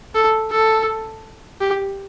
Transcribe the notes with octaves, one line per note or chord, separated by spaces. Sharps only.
A4
A4
G4